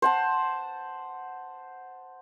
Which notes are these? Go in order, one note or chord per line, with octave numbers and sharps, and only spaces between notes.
C5 F#5 A5